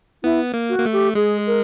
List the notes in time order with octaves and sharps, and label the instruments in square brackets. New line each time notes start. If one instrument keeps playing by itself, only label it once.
[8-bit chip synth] B3 [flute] E4
[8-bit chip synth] A#3
[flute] F#4
[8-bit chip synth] A#3
A3
[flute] G4
[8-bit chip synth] G#3 [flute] G#4
[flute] A#4